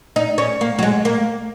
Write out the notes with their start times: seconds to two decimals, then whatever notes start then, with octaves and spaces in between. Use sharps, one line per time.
0.16 D#4
0.38 C#4
0.61 A#3
0.79 F#3
0.83 G#3
1.05 A#3